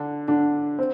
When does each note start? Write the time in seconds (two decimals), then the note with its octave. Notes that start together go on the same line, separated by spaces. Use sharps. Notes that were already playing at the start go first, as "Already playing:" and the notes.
Already playing: D3 D4
0.28 D3 D4
0.79 C4